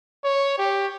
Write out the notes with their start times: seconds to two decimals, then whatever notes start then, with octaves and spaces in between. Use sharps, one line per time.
0.24 C#5
0.59 G4